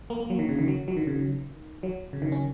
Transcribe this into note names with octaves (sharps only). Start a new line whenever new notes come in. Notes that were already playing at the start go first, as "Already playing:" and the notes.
A#3
A#3
F#3
D#3
C#3
D#3
F#3
F#3
D#3
C#3
D#3
F#3
C#3
D#3
C#4